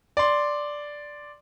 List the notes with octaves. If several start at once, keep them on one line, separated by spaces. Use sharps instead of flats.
D5 C6